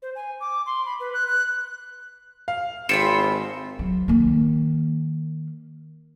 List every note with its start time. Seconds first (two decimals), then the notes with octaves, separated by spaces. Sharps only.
0.02 C5
0.15 G#5
0.40 D6
0.66 C6
0.85 B5
1.00 B4
1.14 F#6
1.27 F#6
2.48 F5
2.89 G#1 C4 F4 B5 C#7 E7
3.79 F#3
4.08 D#3 A#3